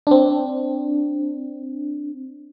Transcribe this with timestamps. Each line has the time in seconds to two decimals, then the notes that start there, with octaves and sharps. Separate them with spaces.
0.07 C4 D4